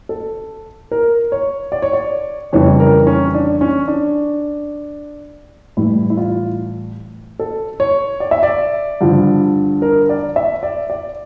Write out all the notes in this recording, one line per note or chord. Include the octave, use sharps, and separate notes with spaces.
A4
A#4
C#5
D5
C#5
D5
F2 C#3 E3 G3 C#5
A#4
C#4
D4
C#4
D4
A2 E3 G3 E4
E4
F4
A4
C#5
D5
E5
D5
G2 D3 F3
A#4
D5
E5
D5
D5